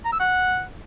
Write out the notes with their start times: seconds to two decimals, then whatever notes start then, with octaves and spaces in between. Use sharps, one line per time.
0.05 A#5
0.12 E6
0.20 F#5